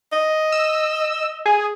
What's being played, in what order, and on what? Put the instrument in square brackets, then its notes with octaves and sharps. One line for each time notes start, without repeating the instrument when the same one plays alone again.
[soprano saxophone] D#5
[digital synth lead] E6
G#4